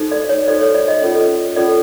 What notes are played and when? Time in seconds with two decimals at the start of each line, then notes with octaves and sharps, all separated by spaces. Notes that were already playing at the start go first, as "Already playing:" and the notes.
Already playing: D#4 F#4 A4 C5
0.12 D5
0.29 C#5
0.48 D#4 F#4 A4 C5 D5
0.61 C#5
0.75 D5
0.88 D#5
1.02 C#4 F4 A4 C#5
1.56 C#4 F4 A4 C#5 D5